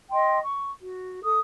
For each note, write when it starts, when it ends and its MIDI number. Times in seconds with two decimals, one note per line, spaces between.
0.12 0.37 75
0.12 0.37 79
0.12 0.37 84
0.42 0.70 85
0.80 1.21 66
1.22 1.38 69
1.22 1.38 87